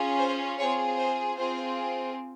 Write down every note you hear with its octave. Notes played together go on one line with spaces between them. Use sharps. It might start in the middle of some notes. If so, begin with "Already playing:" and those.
Already playing: C#4 F4 G#4
C5
C4 F4 G#4 C#5
C5
C4 F4 G#4 C5